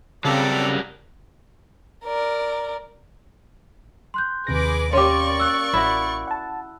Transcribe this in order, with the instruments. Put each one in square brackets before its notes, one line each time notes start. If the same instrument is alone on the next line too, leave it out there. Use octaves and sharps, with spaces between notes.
[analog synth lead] C#3 [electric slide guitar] F#3 G3 A#4 [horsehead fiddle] C4 [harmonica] A4 D5
[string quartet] A#4 D5
[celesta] C6 F#6 G6
[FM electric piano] D#2 C3 A#6 [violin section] G#4 B4 D6
[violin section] A#3 D5 C#6 [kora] C#4 G4 [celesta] C6
[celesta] E6 F#6
[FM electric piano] A1 [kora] E4 F#4
[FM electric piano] F#5 A5